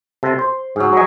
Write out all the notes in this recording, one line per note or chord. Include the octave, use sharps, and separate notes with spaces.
C3 A4 C6
C5
G#2 F#3 G#4
F#3 A#4 D#5 G#5